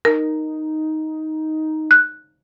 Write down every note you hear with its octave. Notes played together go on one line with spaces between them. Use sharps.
D#4 A#4
F#6